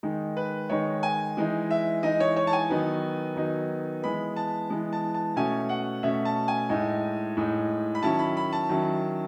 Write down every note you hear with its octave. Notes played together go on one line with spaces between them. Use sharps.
D#3 G#3 D#4
B4
D#3 G#3 D#4 C#5
G#5
E3 G#3 D#4
E5
E3 G#3 D#4 D#5
C#5
C#5
A5
G#5
D#3 F#3 B3 D#4
D#3 F#3 B3 D#4
E3 G#3 B3 B5
A5
E3 G#3 B3
A5
A5
B2 A3 C#4 G#5
F#5
B2 A3 C#4 E5
A5
G#5
A2 G#3 D#4
A2 G#3 D#4
B5
D#3 F#3 C#4 E4 A5
B5
B5
A5
D#3 F#3 C#4 E4